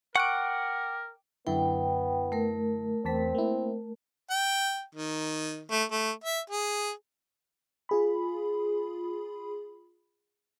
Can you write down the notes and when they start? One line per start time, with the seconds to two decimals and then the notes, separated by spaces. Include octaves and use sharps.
0.16 A#4 F#5 G5 C#6 D6 F#6 D7
1.47 F#2 D3 B3 E4 G5
2.32 A3 A#4
3.05 E2 C4 A5 B6
3.35 A#3 E4
4.31 G5
4.95 D#3
5.71 A3
5.91 A3
6.24 E5
6.50 G#4
7.89 F4 G#4 B5